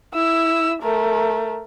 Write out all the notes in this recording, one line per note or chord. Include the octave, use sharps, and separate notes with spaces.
E4 E6
A3 A#4